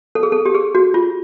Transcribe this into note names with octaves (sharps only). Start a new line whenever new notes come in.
A4
G#4
A4
G4
G#4
F#4
F4